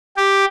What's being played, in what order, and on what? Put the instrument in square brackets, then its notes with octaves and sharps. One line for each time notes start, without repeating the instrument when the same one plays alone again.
[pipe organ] G4